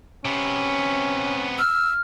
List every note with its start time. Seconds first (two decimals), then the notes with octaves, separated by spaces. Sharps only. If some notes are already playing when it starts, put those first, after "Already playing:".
0.25 C3 B3 C#4
1.58 E6 F6